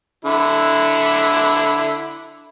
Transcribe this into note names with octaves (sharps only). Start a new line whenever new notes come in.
D3 E4